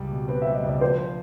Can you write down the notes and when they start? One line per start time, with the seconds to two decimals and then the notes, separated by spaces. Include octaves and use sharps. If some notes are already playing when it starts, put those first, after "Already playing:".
Already playing: C#2 G3
0.11 B2
0.28 C4 B4
0.42 G3 E5
0.55 D#5
0.64 C#2 D5
0.81 F3 C5